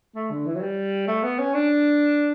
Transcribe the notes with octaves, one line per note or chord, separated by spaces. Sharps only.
A3
D3
E3
F#3
G3
A3
B3
C#4
D4